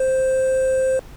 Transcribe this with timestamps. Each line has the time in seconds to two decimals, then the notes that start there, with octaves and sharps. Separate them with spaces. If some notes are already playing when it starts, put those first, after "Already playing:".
Already playing: C5